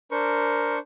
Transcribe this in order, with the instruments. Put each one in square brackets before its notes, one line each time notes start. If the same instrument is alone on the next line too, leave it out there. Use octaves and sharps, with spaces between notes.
[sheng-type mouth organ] D4 C5 C#6 [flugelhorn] A#4